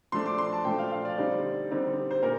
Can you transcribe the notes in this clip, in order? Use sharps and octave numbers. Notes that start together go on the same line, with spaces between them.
F3 A3 D4 C6
D6
C6
A5
F3 A3 D4 G5
F5
F5
D5
D3 G3 C4 D#4
D3 G3 C4 D#4
C5
A#2 A#4